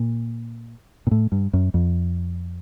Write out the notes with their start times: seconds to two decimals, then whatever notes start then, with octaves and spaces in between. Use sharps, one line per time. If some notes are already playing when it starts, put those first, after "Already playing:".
Already playing: A#2
1.07 A#2
1.11 A2
1.32 G2
1.53 F#2
1.74 F2